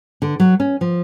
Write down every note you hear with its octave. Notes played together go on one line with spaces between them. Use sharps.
D3
F#3
C#4
F3